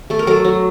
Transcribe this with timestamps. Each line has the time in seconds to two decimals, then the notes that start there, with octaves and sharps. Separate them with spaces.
0.10 A3 A4
0.19 A#4
0.27 F#3 A4
0.45 F#3